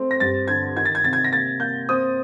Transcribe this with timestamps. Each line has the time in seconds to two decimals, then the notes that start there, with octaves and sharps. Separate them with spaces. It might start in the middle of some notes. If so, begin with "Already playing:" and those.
Already playing: A3 C4
0.11 A#6
0.20 G2 A6
0.48 D3 G#6
0.76 D#3 G#6
0.85 A6
0.95 G#6
1.04 C3 A6
1.13 G#6
1.24 A#6
1.32 A#3 A6
1.60 A#3 G6
1.89 C4 D#6